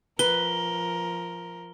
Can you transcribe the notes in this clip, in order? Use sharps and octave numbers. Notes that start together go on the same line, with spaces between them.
F3 A#4 B4 G7